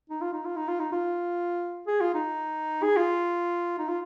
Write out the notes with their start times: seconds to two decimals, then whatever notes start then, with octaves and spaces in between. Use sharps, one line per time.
0.10 D#4
0.21 F4
0.33 D#4
0.45 F4
0.56 D#4
0.68 F4
0.79 D#4
0.92 F4
1.87 G#4
2.01 F4
2.14 D#4
2.83 G#4
2.96 F4
3.78 D#4
3.88 F4